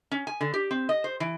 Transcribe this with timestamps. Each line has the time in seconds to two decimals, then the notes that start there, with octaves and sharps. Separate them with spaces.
0.11 C#4
0.27 G#5
0.41 D3
0.54 G4
0.71 C4
0.89 D#5
1.04 C5
1.20 E3